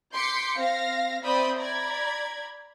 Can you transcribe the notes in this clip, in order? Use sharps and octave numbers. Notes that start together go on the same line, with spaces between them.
C6 D6 G6 B6 C#7
C4 F5 A#6
C4 D5 E5 B5 D#6 G6
D5 A#5 B5 G#6